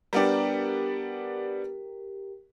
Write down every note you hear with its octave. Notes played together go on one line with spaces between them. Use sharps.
G3 B3 D4 G4 A#4